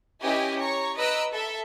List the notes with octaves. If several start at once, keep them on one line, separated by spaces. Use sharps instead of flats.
C#4 E4 G4 B4 D#5 G#5
C#5 A#5 C#6
B4 D#5 A#5 E6 F#6 D7
A4 E5